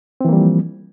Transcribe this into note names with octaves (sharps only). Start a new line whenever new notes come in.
E3 F3 G3 A#3 C4